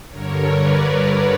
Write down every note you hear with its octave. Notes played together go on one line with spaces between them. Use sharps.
G2 D3 A#4 C#5
B4 D5